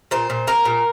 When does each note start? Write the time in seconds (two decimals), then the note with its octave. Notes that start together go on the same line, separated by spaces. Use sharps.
0.11 A#2 C5
0.30 A#2
0.47 A#3 A#4
0.65 A#2